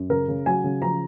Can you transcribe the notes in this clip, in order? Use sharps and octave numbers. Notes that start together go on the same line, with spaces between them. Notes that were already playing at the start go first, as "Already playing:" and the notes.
Already playing: F#2
C#3 A#4
C#3
F#3 G#5
C#3
F3 A#5